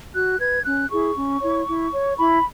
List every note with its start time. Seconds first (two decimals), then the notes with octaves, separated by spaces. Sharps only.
0.14 F#4 F#6
0.39 B4 G#6
0.65 C#4 F#6
0.90 E4 G#4 C#6
1.16 C#4
1.42 E4 C#5
1.67 E4
1.94 C#5
2.18 E4 B5